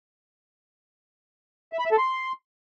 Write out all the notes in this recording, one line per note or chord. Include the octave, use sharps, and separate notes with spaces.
E5
B5
E5
A4
C6